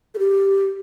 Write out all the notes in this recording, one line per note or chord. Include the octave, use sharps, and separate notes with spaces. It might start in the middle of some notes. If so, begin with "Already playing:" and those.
A4
G4